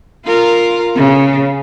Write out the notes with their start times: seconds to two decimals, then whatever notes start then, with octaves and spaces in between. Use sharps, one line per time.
0.25 F4 A#4
0.95 C#3